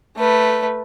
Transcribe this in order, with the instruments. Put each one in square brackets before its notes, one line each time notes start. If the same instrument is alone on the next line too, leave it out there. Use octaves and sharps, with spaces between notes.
[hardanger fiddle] A3 B4